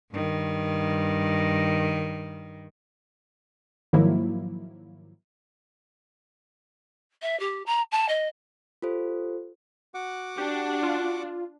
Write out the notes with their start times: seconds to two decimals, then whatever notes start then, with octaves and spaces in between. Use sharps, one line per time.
0.12 G2 D#3
3.93 G#2 D#3 F3 F#3 A#3 E4
7.22 E5
7.40 G4
7.66 A#5
7.92 A5
8.09 D#5
8.82 F4 G4 A4 C5
9.94 F#4 F#5 D6
10.38 D4 G4
10.83 F4